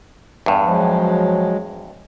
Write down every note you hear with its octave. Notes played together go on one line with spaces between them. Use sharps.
E2 G2
F3 F#3 G#3